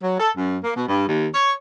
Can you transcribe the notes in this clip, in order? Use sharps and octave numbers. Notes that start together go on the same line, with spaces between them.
F#3
A4
F#2
A#3
B2
G2
D#2
C#5